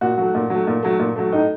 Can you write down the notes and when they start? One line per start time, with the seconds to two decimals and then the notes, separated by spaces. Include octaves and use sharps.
0.01 A#2 F#4
0.18 F#3 A3
0.35 A#2
0.50 F#3 A3
0.67 A#2
0.83 F#3 A3
0.99 A#2
1.16 F#3 A3
1.32 A2 D#4